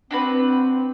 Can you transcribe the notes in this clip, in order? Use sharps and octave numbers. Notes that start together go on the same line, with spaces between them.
C4 D4 F#4 B4